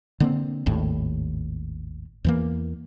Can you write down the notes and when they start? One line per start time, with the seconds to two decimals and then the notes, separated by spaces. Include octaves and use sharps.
0.20 D3 A#3 C4
0.66 G#1 D#2 A2
2.24 E2 E3 A#3